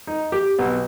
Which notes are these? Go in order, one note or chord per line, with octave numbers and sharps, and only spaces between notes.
D#4
G4
B1